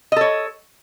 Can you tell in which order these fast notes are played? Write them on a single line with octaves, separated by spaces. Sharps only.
D#5 A4 C#5